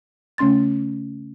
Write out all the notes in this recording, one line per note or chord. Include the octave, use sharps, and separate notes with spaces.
C#3 A3 C#4 C6 A6